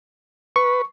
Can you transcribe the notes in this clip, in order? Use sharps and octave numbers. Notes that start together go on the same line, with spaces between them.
B4 C#6